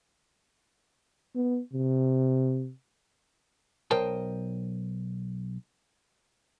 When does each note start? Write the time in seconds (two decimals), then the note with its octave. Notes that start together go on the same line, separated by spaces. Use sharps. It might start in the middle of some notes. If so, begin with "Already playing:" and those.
1.36 B3
1.73 C3
3.91 B1 A#4 C5 D#5 G5 A5